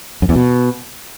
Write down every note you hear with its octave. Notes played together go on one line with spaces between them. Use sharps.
F#2
E2
B2